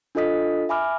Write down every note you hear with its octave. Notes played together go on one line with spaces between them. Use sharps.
D4 F4 A4 D#5 D#6 B6
E5 G#5 B5 D6 F6